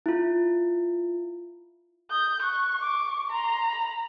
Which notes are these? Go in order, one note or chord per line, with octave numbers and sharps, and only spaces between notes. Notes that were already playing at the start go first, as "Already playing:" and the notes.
E4 F4
D#6 G6
C#6 F#6
D6
A#5 C6
B5